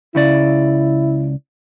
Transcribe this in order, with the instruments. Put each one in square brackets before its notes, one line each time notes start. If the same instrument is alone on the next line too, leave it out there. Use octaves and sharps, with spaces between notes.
[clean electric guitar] C#2 C#3 D5 [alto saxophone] E4